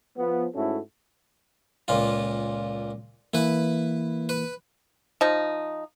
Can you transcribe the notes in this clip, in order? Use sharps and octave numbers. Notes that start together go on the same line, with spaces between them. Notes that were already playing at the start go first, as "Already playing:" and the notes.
F3 B3
G#2 A3 C#4 E4 F#4 A4
C#2 A#2 F4
E3 A#3 E4 B4
B4
F3 D#4